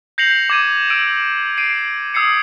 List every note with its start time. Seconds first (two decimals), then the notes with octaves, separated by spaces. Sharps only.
0.18 G6 A#6 C7 C#7 F7 F#7
0.50 D6 G#6 D#7
0.90 E6 D7 D#7
1.58 C7 D7 D#7
2.14 D#6 E6 G#6 C7 C#7